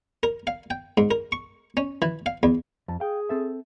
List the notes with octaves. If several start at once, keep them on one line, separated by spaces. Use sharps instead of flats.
A#4
F5
G5
G#2
A#4
C#6
C#4
E3
F5
E2
F2 A5
G#4 F5 G5
C4 A4 E5